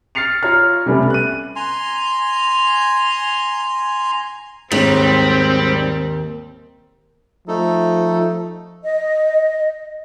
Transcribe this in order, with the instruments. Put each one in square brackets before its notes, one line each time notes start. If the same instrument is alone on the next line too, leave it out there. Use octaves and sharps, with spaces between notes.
[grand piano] F6 A6 C7 C#7 F7
F4 C#5 A#5 F6
C3 G3 A3 B3 C#4
F#6 D#7
[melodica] G#5 A#5 C6
[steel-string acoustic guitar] D#2 [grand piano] G#2 [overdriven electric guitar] G3 [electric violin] C4
[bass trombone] F3 [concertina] A3 D#4 A4
[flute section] D#5